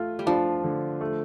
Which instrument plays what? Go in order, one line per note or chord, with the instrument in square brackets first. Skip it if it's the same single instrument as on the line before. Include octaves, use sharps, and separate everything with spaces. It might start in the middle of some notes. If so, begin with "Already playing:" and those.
Already playing: [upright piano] A3 F4
[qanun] G3
[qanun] F3 [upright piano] D4
[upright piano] D3
A3